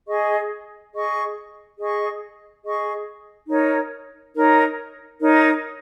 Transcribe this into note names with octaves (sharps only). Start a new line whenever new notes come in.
G#4 D#5 C#6
G#4 D#5 C#6
G#4 D#5 C#6
G#4 D#5 C#6
D#4 A#4 C#5
D#4 A#4 C#5
D#4 A#4 C#5